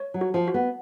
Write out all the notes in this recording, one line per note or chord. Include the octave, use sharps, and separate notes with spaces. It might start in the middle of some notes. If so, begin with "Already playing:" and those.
Already playing: C#5
F#3
F#4
F3
F#4
B3